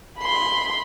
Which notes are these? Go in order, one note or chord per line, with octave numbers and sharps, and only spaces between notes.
B5 C6